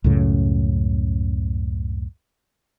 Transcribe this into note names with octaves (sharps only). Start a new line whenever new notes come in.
C#2 F#2 A2 C#3